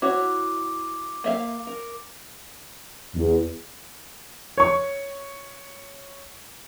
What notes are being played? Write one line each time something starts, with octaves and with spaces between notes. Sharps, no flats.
E4 F#4 C#5 D6
A#3 E5 F5
A#4
E2
C#5 C#6